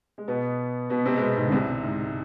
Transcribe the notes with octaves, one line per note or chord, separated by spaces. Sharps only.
G#3
B2 B3
B2 B3
C3 C4
G#3
B2 B3
G#2 G#3
D3
C2 C3
G#2